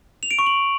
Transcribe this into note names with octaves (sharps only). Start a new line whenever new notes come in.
F7
D7
C#6
F#7